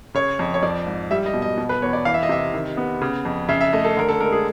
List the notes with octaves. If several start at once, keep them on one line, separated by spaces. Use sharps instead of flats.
C#3 C#5
F2
C#5
F3 D5
G#2
G3 E5
D#5
B2
D#5
B2
B4
E2 C#5
D5
E3 F5
E5
D#5
C3 E5
D#3
B3
C#3
F2
C#3 E5
E5
A3 D#5
A4
D3 A#4
A4
G#3 A#4
G#4